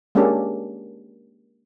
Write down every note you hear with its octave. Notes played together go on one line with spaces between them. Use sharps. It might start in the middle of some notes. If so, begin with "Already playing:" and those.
G#3 A#3 C#4 D4 G4 A4